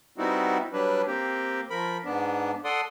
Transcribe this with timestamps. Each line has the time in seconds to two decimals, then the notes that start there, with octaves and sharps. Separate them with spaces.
0.18 G3 B3 C4 D#4 E4 F#4
0.73 F#3 G3 D4 B4
1.07 A#3 C4 G4
1.70 F3 A#4 B5
2.05 G#2 B3 D4
2.65 A4 D5 F#5 C6 D#6